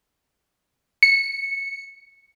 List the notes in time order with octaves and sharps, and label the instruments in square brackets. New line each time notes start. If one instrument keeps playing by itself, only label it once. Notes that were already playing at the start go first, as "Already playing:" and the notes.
[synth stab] C#7